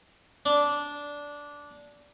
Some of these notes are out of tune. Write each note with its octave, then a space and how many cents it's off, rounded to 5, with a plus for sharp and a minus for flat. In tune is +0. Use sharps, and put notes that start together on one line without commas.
D4 -10